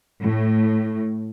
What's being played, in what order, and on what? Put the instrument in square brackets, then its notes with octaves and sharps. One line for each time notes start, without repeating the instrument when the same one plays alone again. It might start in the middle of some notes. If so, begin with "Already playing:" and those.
[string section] A2